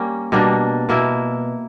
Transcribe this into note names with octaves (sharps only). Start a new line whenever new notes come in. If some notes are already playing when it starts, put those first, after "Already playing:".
Already playing: G3 A#3 C#4
B2 G3 A#3 D4
B2 A#3 E4